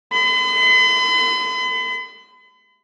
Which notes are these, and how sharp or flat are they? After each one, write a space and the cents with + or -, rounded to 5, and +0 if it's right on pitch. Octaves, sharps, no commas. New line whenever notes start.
B5 +45